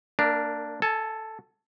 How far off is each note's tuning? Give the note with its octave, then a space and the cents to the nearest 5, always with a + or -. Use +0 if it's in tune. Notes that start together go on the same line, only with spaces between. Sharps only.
A#3 -35 D4 +0 A#4 +0
A4 +0 G#5 +35